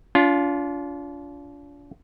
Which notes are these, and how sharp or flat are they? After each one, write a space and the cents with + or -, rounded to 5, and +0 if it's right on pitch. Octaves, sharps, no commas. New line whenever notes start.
D4 -40 F4 +0